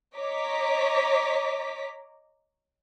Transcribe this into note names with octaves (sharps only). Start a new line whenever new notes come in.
C#5 D#5 A#5 D6 B6